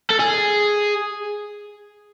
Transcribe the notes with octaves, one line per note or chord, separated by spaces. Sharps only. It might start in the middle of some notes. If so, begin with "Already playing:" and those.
A4
G#4